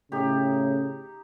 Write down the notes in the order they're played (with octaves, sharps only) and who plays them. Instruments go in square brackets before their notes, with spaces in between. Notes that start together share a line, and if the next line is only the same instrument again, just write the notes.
[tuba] A2 [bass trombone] C#3 [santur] D#4 G4